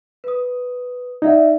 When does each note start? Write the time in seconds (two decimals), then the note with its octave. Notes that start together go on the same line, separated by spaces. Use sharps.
0.24 B4 D#6
1.22 D#4 D5 E5 F#5